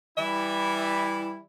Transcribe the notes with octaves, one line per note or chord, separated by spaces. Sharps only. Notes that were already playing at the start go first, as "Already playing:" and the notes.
E3 G3 E4 E5